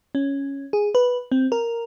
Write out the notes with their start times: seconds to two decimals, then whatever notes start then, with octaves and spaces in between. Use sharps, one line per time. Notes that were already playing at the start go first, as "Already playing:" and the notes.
0.15 C#4
0.73 G#4
0.95 B4
1.32 C4
1.52 A#4